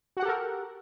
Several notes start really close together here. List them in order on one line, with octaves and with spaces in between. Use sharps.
F#4 F#5 G4 A4 A#4